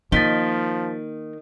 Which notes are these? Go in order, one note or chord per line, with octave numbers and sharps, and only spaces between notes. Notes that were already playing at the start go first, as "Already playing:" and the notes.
D#3 F3 A#3 A6 B6 G7